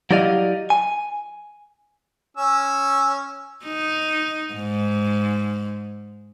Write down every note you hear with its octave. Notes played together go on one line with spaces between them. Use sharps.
F#3 E4 G4 D5 D#5 F5
G#5
C#4 E6
D#4
G#2